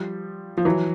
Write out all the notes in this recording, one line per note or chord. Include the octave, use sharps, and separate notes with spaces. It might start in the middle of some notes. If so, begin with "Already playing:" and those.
Already playing: F3 G3
F3
E3 F#3